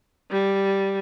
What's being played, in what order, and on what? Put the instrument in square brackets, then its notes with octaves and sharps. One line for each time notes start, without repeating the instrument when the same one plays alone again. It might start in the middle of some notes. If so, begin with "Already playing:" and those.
[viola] G3